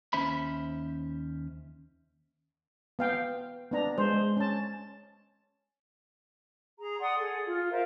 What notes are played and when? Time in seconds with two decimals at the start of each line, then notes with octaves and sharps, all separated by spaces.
0.13 D#2 C#4 C5 E5 B5
2.99 B3 F5 G5
3.72 B3 D4 A#5
3.98 G#3 C5
4.37 C#4 A5
6.78 G#4 A#5
7.00 D5 F#5 C6 D#6
7.19 G#4 A4
7.46 F4
7.71 A#4 C5 E5 F5